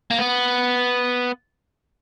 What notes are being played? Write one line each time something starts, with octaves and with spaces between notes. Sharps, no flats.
A#3
B3